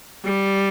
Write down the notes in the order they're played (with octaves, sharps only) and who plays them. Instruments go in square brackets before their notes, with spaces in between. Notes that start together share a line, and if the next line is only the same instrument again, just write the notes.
[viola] G3